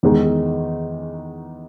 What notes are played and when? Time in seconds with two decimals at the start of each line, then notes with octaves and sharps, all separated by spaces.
0.03 E2 D#3 G#3 D#4